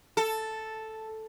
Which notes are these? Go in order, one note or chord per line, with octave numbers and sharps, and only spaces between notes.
A4